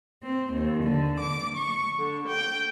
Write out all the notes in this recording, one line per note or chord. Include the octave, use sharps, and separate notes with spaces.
C4
D#2
D3
D6
C#6
D3
G5